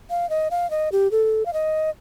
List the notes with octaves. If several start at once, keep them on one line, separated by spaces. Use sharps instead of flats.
F5
D#5
F5
D#5
G4
A4
F5
D#5